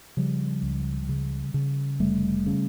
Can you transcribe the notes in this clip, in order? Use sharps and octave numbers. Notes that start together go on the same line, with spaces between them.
C#3 F3 G3
C#2
C#3
C#3
F1 G3 A3
C#3